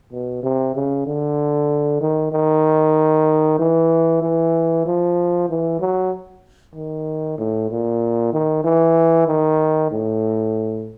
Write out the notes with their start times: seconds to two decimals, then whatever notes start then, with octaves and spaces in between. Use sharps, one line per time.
0.12 B2
0.43 C3
0.75 C#3
1.06 D3
2.01 D#3
2.32 D#3
3.59 E3
4.22 E3
4.85 F3
5.49 E3
5.80 F#3
6.75 D#3
7.38 A2
7.70 A#2
8.33 D#3
8.64 E3
9.27 D#3
9.91 A2